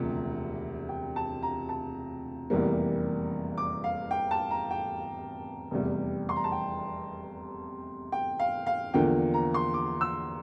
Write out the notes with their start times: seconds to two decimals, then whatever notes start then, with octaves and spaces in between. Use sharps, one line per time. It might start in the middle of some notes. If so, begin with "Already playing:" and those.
Already playing: E1 D2 C3 F3
0.89 G5
1.16 A5
1.43 A#5
1.69 A5
2.50 F1 E2 E3 G3 A#3
3.58 D6
3.84 F5
4.11 G5
4.31 A5
4.51 A#5
4.71 G5
5.71 F1 E2 C3 G3
6.29 C6
6.36 A#5
6.44 A5
6.52 G5
8.12 G5
8.40 F5
8.67 F5
8.94 E2 D3 F3 A#3 G5
9.34 A#5
9.54 C6
9.74 D6
10.01 E6